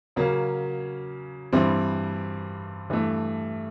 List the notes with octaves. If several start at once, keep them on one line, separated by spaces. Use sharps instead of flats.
C#3 F#3 A#3 C#4
G2 E3 G3 C4
G2 E3 A3